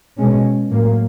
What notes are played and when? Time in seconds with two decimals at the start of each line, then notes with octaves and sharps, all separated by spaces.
0.19 B2 G#3 C#4
0.71 A2 F#3 A#3